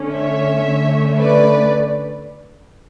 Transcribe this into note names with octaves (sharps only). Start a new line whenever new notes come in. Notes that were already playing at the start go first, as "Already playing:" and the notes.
Already playing: D3 A3 C#4
C#5 E5
D3 A3 C#4
B4 D5